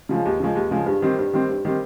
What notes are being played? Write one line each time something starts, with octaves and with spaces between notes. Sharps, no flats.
C#3 F3 G#3
D#2
C#3 F3 G#3
D#2
C#3 F3 G#3
G2
D#3 G3 C4
G2
D#3 G3 C4
G2
D#3 G3 C4